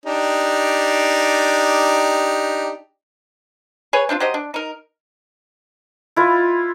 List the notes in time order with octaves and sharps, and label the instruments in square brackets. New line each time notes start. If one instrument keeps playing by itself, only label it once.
[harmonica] D4 D#4 G4
[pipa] G#4 B4 C#5
C4 D4 E4 F4
F#3 G4 C5 D#5
D4
D#4 A#4
[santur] E4 F4 B4